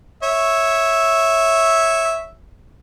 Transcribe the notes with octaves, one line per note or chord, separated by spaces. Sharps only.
C#5 E5